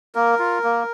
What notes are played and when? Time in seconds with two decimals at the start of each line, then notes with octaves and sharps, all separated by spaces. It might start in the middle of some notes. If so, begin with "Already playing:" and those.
0.15 A#3 A#4
0.39 F4
0.64 A#3